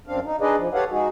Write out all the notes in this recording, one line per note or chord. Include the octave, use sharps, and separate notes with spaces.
F#2 C4 D4 F5
D#4
D4 D#4 G#4 B4 D5 D#5
F3
G4 A4 B4 C#5 F5 F#5
G#3 D#4 F#4 G#4